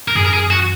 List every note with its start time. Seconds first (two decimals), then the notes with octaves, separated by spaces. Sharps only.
0.08 A#4
0.15 F#2 G#4
0.26 A#4
0.34 G#4
0.51 F#4